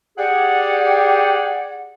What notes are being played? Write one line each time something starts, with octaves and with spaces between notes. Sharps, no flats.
G4 G#4 D5 F#5